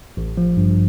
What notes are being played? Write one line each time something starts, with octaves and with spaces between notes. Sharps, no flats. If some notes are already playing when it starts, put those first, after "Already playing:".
A1
F3
G2